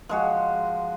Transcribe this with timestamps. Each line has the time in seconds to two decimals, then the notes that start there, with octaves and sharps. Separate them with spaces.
0.09 F3 G#3 F#4